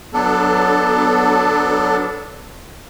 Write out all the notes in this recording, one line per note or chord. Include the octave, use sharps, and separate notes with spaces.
F#3 B3 D4 A4